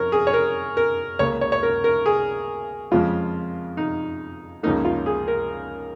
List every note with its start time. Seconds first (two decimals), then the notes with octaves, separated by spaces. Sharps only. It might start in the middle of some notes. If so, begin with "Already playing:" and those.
Already playing: F2 A#4 C#5
0.12 G#4
0.27 C#5
0.33 A#4
0.77 A#4
1.19 C#2 C#3 A#3 C#5
1.41 C#5
1.52 C#5
1.63 A#4
1.84 A#4
2.06 G#4
2.91 F2 C#3 F3 G#3 F4
3.77 D#4
4.63 C#2 C#3 F3 A#3 D#4
4.85 F4
5.06 G#4
5.28 A#4